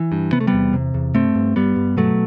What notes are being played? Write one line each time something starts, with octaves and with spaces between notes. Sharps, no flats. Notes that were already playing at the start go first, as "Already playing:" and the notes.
Already playing: E3
G2
C3 B3
A3
G3 B3
E2
C3
E2
G2 A3 C4
G2
G2 G3 B3
G2
B2 F#3 A3